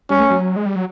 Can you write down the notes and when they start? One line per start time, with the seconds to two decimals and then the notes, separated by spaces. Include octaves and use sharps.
0.10 G3 C#4
0.20 A3
0.31 F#3
0.56 G#3
0.66 G3
0.76 F#3